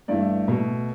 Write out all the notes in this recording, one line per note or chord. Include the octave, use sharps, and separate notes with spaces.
G2 E3 A3 D5
B2 A3